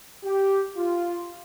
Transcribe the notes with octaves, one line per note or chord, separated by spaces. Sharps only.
G4
F4